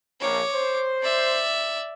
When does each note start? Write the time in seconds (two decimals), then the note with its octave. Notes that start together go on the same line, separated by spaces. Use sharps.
0.20 A#1 A#3 C#5 D6
0.53 C5
1.02 D5 E5